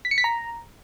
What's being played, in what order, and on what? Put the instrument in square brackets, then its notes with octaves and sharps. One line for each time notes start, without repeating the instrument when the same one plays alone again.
[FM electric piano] B6
C#7
B6
A#5